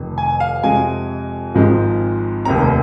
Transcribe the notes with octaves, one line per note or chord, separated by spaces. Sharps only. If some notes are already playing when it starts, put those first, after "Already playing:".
Already playing: F1 F2 D#3
G#5
F5
F2 C3 G#3 G#5
G#1 G#2 F3 G#3 C4
F1 D#2 D#3 C4 A#5